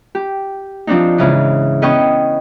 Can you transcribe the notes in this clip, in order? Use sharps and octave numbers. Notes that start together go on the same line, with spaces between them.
G4
F3 C4 D4 D#4
G#2 C#3 E3
B3 C#4 B4 D#5 G5 C#6